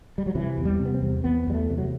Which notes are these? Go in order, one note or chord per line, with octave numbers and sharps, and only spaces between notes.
G3
F#3
C3 E3
E2
G3
C3
B3
C4
E2
E2 B3
E2 G3
A3
C3
F#3